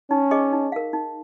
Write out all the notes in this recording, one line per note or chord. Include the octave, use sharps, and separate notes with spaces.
C#4 D#4
G#4 D#5 C#6
D#4
A#4 F5
D#4